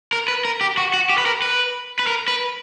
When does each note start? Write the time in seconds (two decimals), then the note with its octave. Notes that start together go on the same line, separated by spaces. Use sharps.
0.13 A#4
0.28 B4
0.45 A#4
0.61 G4
0.77 F#4
0.94 F#4
1.10 G4
1.18 B4
1.26 A#4
1.42 B4
1.99 B4
2.07 A#4
2.28 B4